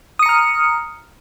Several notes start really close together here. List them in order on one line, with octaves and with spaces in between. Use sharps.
D#6 C#7 A#5 F6